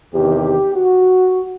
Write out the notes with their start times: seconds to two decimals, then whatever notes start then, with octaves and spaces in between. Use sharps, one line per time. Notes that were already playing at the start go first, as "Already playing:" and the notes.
0.13 E2 C3 D#3 G4
0.75 F#4